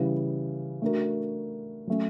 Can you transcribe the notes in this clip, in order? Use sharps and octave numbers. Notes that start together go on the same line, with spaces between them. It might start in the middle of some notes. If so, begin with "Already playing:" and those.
Already playing: C#3 E3 G3
A3 D4 F#4 A#4
F#3 A3 C#4